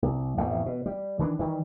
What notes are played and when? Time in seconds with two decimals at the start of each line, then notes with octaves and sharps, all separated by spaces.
0.02 C2
0.37 A1 F2 B2
0.66 B2
0.86 G3
1.19 D#3 E3 B3 D4
1.39 D#3 E3 G3